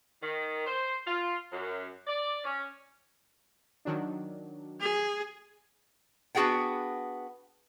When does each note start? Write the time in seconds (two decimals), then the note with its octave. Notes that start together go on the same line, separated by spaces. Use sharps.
0.22 D#3
0.66 C5
1.07 F4
1.52 F#2
2.07 D5
2.44 C#4
3.85 D#3 F#3 D4
4.80 G#4
6.35 B3 D4 F#4 G#4 F#5 G5